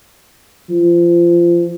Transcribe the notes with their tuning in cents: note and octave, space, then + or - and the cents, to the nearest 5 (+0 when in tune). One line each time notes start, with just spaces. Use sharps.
F3 -25